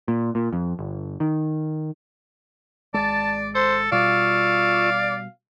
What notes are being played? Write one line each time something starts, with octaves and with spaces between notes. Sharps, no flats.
A#2
A#2
F2
G1
D#3
G#1 G#3 D5 A5
A4 C5
B2 G3 F4 D5 F5 C#6 E6